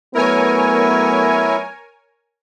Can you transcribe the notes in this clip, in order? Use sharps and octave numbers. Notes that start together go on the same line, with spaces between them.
F#3 A3 B3 E4 A#4 C#5 G#5